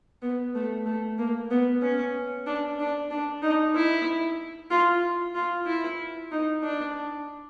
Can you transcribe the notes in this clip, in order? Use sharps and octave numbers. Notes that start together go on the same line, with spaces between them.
B3
A3
A3
A#3
B3
C#4
D4
D4
D4
D#4
E4
F4
F4
E4
D#4
D4